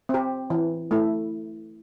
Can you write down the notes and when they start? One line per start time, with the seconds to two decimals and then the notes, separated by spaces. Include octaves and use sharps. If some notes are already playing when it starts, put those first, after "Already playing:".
0.09 C4 G4
0.50 E3
0.91 A3 E4